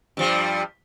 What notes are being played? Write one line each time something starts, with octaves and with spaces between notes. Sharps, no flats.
G2 F3 G3